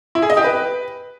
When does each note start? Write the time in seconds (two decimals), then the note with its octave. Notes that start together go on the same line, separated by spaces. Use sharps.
0.15 E4
0.22 G#4
0.30 D#5
0.37 G4
0.44 B4